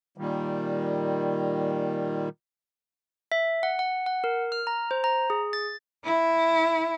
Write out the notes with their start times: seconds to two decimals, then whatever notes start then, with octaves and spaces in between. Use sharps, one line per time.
0.18 A#2 D#3 G3
3.32 E5
3.63 F#5
3.79 F#5
4.06 F#5
4.24 A#4
4.52 F6
4.67 A#5
4.91 C5
5.04 A#5
5.30 G#4
5.53 A6
6.05 E4